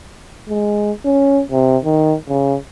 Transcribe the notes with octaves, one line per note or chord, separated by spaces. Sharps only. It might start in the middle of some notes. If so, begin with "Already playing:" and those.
G#3
C#4
C3
D#3
C#3